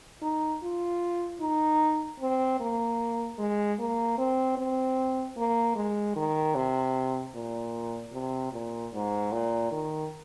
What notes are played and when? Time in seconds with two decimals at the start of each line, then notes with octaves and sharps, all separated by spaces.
0.22 D#4
0.63 F4
1.41 D#4
2.20 C4
2.60 A#3
3.39 G#3
3.79 A#3
4.18 C4
4.57 C4
5.37 A#3
5.76 G#3
6.16 D#3
6.55 C3
7.35 A#2
8.13 C3
8.53 A#2
8.94 G#2
9.32 A#2
9.71 D#3